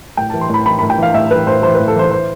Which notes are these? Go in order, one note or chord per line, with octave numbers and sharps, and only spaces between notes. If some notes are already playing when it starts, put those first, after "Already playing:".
A2 G5
E3 A5
C6
A2 B5
E3 B5
A2 B5
G5
E3 F5
A2 E5
E3 B4
A2 C5
E3 C5
A2 B4
A4
E3 C5
C5